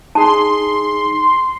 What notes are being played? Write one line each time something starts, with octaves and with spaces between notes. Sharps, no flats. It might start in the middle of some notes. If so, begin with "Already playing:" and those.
D#4 G#4 A5 C6